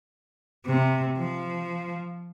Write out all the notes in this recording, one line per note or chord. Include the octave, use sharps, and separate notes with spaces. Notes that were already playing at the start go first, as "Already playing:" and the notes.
C3
F3